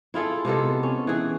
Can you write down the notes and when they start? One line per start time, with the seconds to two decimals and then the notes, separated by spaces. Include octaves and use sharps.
0.14 E4 F4 G#4 A4
0.45 C3 G#3 B3 A4
0.83 C#4
1.07 E3 G#4